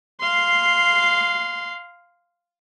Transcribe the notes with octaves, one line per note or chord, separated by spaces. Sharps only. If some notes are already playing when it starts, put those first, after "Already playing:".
F5 C6